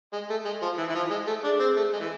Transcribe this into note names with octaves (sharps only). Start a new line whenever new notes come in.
G#3
A3
G#3
F3
E3
E3
F3
G#3
A3
D4 G#4
C4
A3
G#3
E3